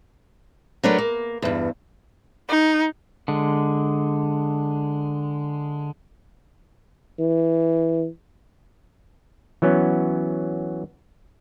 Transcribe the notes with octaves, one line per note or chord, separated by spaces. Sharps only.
F#3 A3 D4 A#4 B4 C#5
A#3
E2 G2
D#4
D3 G#3
E3
E3 F#3 B3 C#4